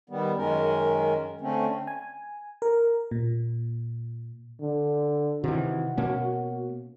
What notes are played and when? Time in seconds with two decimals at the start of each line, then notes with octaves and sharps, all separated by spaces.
0.10 D#3 G3 B3
0.37 F#2 D#3 G#3 C#4 A#4
1.41 D3 A3 C4 C#4
1.87 G#5
2.62 A#4
3.11 A#2
4.60 D3
5.44 C3 D#3 E3 F#4
5.97 B2 A#3 C#4